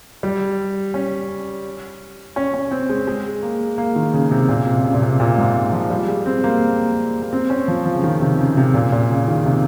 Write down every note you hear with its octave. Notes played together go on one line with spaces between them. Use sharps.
G3
C#4
C#4
C#4
C4
G#3
G#3
A#3
A#3
D#3
C#3
C3
A#2
C3
C#3
A#2
C3
A#2
G#2
F3
G3
G#3
C4
A#3
A#3
C4
C#4
F3
F3
C#3
D#3
C3
C#3
C3
A#2
A#2
C#3
D#3
C3